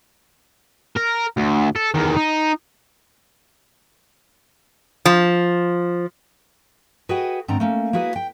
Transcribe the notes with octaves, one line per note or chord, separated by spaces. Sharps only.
A#4
D2
A4
E2 D#3
D#4
F3
F#4 G#4 B4 D#5 F#5 G5
G#2 D#3 C4 D4 F#5 A#5
A3 A#3 C#4
A#3 E4 F#4 G#4 B4
G5